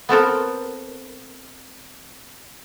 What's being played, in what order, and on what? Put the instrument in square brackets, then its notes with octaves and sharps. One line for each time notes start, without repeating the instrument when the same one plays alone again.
[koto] B3 C4 A4 A#4